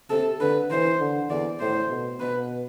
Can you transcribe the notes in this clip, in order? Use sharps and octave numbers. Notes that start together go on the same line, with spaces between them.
C3 A4
D3 B4
E3 C5
D3
E2 D5
A2 C5
B2
B2 B4